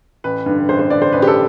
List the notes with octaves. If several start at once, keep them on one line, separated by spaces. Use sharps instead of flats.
A1 B4
G2 D3
A1 C5
C5
G2 D3 D5
C5
A1 B4
G4
A4